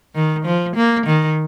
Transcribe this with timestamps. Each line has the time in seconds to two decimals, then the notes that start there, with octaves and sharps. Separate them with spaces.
0.15 D#3
0.45 F3
0.76 A#3
1.06 D#3